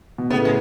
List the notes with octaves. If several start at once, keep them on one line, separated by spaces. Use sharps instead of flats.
B2
A2 C#3 B3
G#3